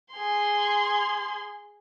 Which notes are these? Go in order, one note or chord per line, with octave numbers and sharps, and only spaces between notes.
G#4 C6